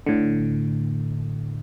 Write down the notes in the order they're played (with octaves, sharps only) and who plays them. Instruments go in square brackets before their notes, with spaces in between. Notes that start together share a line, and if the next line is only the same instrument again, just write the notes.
[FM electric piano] A2 D3